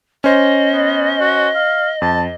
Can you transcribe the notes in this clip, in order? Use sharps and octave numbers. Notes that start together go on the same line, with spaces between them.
C#4 C5 D#5
B3
F#4
F5
F2 A5